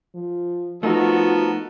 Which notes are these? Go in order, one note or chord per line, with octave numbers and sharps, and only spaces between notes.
F3
F3 A3 B3 D#4 F#4 A4 A#4